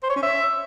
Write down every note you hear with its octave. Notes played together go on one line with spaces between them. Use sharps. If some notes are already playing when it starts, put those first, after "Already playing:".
C5
C#5
C#4
E5